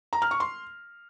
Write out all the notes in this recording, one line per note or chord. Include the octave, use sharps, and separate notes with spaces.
A#5
F6
C#6
C6